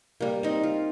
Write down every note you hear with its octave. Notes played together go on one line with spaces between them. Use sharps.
G3 A#3
C4 D#4
F4